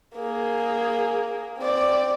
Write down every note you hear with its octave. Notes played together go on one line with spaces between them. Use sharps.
A#3 G#4
C4 D5